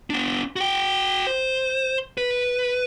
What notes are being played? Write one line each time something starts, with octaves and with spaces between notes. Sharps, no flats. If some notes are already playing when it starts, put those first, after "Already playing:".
B3 D4
F#4 G5
C5
B4